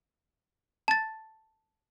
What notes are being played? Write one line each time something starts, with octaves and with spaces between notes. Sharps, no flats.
A5 A6